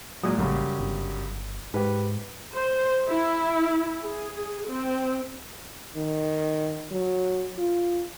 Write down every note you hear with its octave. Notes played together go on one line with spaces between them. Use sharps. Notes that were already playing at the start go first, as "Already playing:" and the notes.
A#2 F#3 G#3 D#6
A1 F#2 C#3 G3
G1
G#2 G4 B4
C5
E4
G#4
C4
D#3
F#3
F4